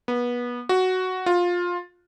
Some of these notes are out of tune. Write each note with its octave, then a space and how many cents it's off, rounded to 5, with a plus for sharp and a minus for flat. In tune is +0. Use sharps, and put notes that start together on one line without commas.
B3 -25
F#4 +5
F4 +15